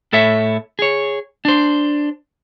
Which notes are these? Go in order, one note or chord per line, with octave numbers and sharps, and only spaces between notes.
A2 A4 C#5 E5
G#4 C#5
D4 C5